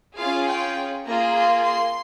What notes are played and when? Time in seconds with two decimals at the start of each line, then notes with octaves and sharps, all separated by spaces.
0.16 C#4 F4 G#4 F5
0.46 G5
1.05 A#3 F4 G#4 A#5
1.35 C6
1.65 C6